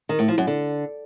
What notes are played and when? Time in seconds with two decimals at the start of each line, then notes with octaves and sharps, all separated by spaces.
0.09 D#3
0.19 A2
0.28 F3
0.38 F#2
0.47 D3